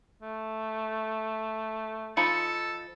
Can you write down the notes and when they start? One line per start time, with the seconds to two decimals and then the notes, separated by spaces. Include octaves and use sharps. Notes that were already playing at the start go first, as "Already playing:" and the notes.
0.22 A3
2.17 F3 D#4 A4 B5 C#7